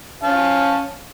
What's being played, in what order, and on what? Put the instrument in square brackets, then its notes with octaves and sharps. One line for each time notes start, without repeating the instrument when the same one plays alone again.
[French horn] C#4 [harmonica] F5 A5